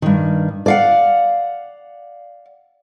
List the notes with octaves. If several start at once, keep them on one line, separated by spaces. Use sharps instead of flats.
G2 D#3
D5 F5 F#5